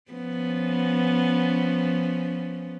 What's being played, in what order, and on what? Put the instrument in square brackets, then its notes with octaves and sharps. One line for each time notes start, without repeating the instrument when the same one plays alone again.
[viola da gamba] F3 B3 C#4